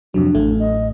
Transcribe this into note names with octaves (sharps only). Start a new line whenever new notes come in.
F2 C3 F#3 D4
A1 A2 A3
D#5